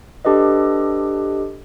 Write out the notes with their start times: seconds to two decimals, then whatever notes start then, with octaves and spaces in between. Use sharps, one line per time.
0.25 D4 G4 A4 B4 D#5